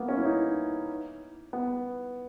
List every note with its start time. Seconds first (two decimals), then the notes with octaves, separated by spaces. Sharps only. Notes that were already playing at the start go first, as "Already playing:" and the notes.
Already playing: A#3 B3
0.09 C#4
0.18 E4
0.25 D#4
1.53 B3